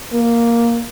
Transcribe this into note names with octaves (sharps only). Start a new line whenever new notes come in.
A#3